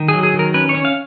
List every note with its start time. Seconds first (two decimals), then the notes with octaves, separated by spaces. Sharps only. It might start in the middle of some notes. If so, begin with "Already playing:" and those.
Already playing: D#3
0.08 F#3 G#4
0.23 G#4
0.34 D#3
0.39 A#4
0.54 C#4 B4
0.69 C#5
0.75 C#4
0.85 F5